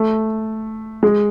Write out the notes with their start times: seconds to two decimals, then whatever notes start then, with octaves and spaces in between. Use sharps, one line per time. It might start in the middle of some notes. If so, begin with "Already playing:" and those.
Already playing: A3
1.03 G#3